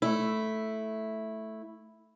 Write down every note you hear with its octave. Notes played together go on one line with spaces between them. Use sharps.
A3 E4